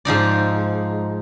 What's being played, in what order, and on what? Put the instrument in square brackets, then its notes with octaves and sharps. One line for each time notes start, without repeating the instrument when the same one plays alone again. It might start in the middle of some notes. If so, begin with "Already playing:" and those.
[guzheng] G#2 F3 D#4 D5